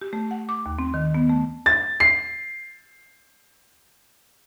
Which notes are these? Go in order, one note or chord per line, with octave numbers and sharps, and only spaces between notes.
G4
A3
F#5
D6
D#2
C4
D#3
B3
A3
A6
C7